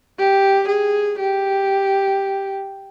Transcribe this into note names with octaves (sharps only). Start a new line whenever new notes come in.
G4
G#4
G4